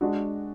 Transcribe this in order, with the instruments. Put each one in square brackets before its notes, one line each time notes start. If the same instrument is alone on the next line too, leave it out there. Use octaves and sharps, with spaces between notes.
[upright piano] G#3 D4 F#4